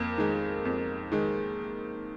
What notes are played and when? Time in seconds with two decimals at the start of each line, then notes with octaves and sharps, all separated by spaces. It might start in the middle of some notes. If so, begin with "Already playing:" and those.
Already playing: F2 A#3
0.18 D#3 G#3
0.65 F2
1.12 D#3 G#3